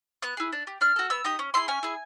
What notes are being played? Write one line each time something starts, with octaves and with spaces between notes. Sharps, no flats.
B3 F#6
E4 G#4
D4
G4
D4 F6
F#4 A4
B3 E6
D#4 G4 D#6
C#4
E4 G#4 C6
C#4 G#5
E4 G#4